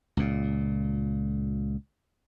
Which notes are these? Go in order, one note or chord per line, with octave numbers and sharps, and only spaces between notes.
C#2 A#2